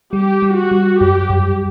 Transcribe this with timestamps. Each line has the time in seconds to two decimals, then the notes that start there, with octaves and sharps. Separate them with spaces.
0.13 G3 G4
0.42 G3
0.56 F#4
0.71 G3
1.01 F#2 G4
1.30 F#2